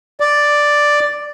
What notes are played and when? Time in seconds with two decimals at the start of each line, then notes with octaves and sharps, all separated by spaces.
0.20 D5